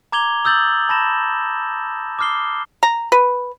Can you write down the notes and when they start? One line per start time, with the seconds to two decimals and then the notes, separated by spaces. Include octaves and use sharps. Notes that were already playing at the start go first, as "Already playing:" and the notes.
0.12 A#5 D6 G#6 F7 G7
0.45 D#6 E6 G6 A6 F#7
0.89 A5 B5 A#6 E7
2.19 D6 D#6 F6 C7 G7
2.83 A#5
3.12 B4